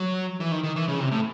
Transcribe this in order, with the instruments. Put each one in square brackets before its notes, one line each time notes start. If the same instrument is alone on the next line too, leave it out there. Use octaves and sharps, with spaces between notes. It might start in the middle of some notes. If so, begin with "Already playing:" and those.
Already playing: [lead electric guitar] F#3
E3
D#3
D#3
E3
C#3
C3
A2